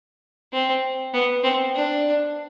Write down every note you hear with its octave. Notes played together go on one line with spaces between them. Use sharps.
C4
B3
C4
D4